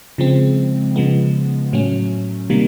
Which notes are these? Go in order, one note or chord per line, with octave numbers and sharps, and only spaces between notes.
C#3 F3 G#3 C4
C#3 F3 G#3 B3
A2 F#3 A3 C#4
C3 D#3 G3 A#3